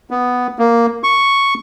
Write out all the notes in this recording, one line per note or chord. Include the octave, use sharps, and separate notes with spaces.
B3
A#3
C#6